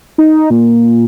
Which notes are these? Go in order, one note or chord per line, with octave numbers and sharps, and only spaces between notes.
D#4
A#2